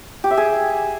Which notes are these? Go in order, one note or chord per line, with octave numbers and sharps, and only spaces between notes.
G4
E5
G#4